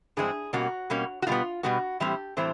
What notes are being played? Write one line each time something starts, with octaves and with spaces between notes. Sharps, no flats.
G2 E3 G#3 C4 G#4
B2 G3 A#3 C#4 F#4
B2 G3 A#3 C#4
F#4
B2 G3 B3 F4
B2 G3 B3 F#4
A2 E3 G3 C4 G4
A2 E3 G3 C4 C5